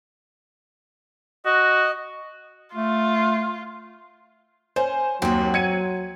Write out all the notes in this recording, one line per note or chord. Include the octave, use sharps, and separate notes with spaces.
F#4 D#5
A3 F4
C#4 C5
D#2 F#3 C4 F#4
G#6 C#7 D#7